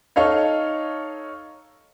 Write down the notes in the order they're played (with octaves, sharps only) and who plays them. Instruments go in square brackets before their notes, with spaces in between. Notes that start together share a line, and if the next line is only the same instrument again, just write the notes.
[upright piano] D#4 A4 C#5 F5